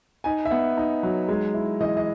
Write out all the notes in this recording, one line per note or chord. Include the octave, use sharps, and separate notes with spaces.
D#4 G#5
E5
B3 F#5
D#4
F#3
G#3
E4
E3 D#5
D#5